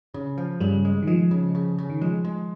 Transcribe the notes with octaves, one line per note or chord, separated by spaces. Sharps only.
C#3
F3
G2 C#3 G3
G#3
D#3
F3 G#3
C#3
C#3
C#3
D#3
F3 G#3
G#3